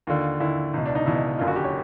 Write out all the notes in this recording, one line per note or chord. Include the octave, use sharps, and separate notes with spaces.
D#2 D3 F4
D#2 D3 E4
C#2 B2
D4
D#4
C#2 B2 E4
F#1 F#2 D3 F4
F#4
G4
C#5